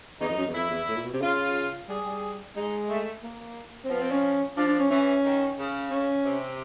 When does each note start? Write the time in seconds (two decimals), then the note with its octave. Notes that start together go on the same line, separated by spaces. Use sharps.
0.21 E2 D#4
0.29 F2
0.37 F#2
0.46 E2
0.54 F2 E4
0.70 E2
0.88 A2
0.96 A#2
1.04 B2
1.13 C3
1.21 C#3 F4
1.88 G3 G#4
2.05 G3
2.55 G#3 D#4
2.88 A3
3.23 A#3
3.84 C4
3.90 F3 B3
4.01 C4
4.12 C#4
4.57 F3 D4
4.67 D4
4.79 C#4
4.90 E3 C#4
5.24 D#3
5.58 C#3
5.90 C#4
6.24 C3